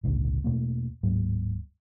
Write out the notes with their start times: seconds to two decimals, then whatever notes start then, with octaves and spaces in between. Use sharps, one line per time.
0.04 G#1 C#2 A#2 D3
0.44 E2 B2 A3 A#3
1.03 D1 G#2 F#3 A#3